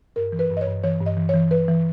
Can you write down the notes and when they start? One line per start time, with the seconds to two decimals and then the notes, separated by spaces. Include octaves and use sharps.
0.16 G2 A#4
0.32 E3
0.39 B4
0.50 G2
0.57 D#5
0.61 C#5
0.67 G2
0.84 E3 C#5
1.00 G2
1.06 D#5
1.17 E3
1.29 E3 C#5
1.51 E3 B4
1.68 E3